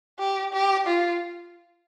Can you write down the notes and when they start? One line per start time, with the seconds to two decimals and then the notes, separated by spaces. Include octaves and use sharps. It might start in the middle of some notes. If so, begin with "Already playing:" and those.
0.19 G4
0.53 G4
0.87 F4